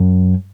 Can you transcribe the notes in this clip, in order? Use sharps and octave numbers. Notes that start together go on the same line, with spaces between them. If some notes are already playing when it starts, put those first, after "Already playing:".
Already playing: F#2